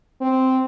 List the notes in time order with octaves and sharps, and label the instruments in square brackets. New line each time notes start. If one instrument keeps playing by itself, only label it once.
[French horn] C4